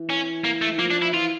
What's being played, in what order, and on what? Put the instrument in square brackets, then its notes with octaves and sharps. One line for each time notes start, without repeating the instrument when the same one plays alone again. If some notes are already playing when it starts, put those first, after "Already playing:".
Already playing: [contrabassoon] E3
[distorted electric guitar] C#4
A#3
A3
[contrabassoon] E3
[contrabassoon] F3 [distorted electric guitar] A#3
[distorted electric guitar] D4
E4
[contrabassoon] E3 [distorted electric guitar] F4